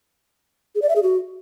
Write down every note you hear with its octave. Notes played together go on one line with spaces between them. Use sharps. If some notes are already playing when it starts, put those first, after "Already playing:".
G#4
D5
E5
G#4
F#4